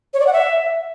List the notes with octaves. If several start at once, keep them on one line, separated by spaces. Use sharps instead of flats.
C#5
D5
F#5
E5